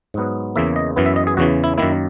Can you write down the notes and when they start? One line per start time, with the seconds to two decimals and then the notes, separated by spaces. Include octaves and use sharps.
0.14 G#2 F#3 B3
0.56 E2 C#3 E3 A#3 E5
0.76 D#5
0.96 F#2 E3 B3
1.06 E5
1.16 D#5
1.27 G#4
1.37 E2 C#3 E3 F#4
1.64 E4
1.78 F#2 D#3 A#3 E4